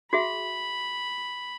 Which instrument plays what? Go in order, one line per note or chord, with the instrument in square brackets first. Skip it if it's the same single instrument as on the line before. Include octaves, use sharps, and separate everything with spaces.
[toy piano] F#4 G#4 E5 [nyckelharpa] B5